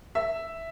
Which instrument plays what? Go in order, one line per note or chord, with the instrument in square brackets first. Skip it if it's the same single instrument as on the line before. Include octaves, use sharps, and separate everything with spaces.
[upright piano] E5